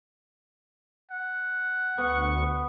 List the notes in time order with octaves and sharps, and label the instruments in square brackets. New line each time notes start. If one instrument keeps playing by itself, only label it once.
[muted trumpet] F#5
[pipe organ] D2 C#6 [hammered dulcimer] B3